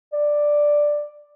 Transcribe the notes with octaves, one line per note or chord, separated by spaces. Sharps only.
D5